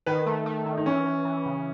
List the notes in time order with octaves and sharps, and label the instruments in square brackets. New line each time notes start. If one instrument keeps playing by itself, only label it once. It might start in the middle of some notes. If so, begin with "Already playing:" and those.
[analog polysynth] D#3 [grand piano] B4
[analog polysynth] A3
A3
D#3
[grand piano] D#4
[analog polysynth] E3 [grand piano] C#4
[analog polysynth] E3
E3
C#3